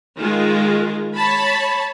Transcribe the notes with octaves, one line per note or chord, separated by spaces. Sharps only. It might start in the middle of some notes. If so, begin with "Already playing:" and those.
D#3 G#3 F4
C#5 A5 B5